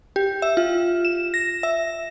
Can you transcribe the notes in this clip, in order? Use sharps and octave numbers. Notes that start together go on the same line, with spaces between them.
G4
E5
F4
E7
A#6
E5